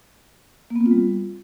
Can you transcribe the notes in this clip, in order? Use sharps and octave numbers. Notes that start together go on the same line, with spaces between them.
A#3
B3
C4
F4
G3